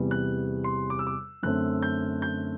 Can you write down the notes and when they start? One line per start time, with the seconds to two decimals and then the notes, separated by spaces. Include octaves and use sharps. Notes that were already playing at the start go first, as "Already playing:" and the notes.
Already playing: E2 C3 G3 B3
0.11 F#6
0.64 C6
0.90 D6
0.99 E6
1.07 D6
1.43 F#2 D3 A3 C4 F#6
1.83 G6
2.22 G6